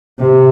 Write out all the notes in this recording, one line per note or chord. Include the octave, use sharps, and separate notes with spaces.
C3